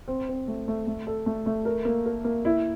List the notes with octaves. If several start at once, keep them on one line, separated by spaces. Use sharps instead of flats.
C4
C4
A3
A3
A3
A4
A3
A3
A#4
A#3
A#4
A#3
E4